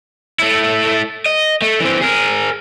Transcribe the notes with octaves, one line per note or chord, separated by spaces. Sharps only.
A3 E4
D#5
A3
E3 C4
G#4 A#4